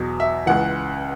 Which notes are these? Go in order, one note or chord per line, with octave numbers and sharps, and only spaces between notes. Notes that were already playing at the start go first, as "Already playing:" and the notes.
Already playing: E2 B2 F#3
E5
C#2 C#3 E3 F#5